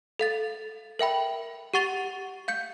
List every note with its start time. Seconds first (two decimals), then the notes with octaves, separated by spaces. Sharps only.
0.19 A4 F5 A6
0.99 A#4 E5 G5 B5
1.74 G4 F#5 C#6 A6 F7 G7
2.48 F5 G6 C#7